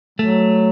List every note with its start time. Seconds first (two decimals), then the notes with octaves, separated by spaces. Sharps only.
0.19 F#3 A3